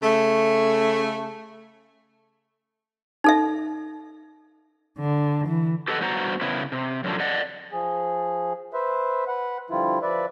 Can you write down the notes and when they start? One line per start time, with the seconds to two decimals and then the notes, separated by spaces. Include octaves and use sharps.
0.02 C#3 A3
3.24 D#4 A4 E5
4.99 D3
5.47 E3
5.88 G4 A4 B4 D#5 F#5
6.01 G2 B3 F#4 C5 F#5 A#5
6.41 C#3 B3 E4
6.72 C3
7.04 F#2 D3 F3
7.20 D5 D#5 F#5
7.72 F3 G#4
8.73 B4 C5 E5
9.28 B4 F#5
9.70 D3 F3 G3 E4 F4
10.02 F3 B4 D5 E5